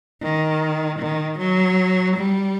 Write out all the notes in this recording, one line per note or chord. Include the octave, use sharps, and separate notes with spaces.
D#3
D#3
F#3
G3